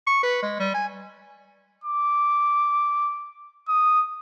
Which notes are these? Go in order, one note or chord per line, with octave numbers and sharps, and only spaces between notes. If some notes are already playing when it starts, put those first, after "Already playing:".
C#6
B4
G#3
G3
G#5
D6
D#6